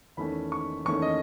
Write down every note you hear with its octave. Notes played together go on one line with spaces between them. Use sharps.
E2 D#3 A3 C#4 B5
C#6
E2 D#3 A3 C#4 C#6
D#5